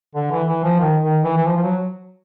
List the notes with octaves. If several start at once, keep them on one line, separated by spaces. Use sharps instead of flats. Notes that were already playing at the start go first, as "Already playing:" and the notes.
D3
E3
E3
F3
D#3
D#3
E3
E3
F3
F3
F#3